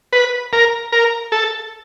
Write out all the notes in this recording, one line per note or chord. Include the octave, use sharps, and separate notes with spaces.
B4
A#4
A#4
A4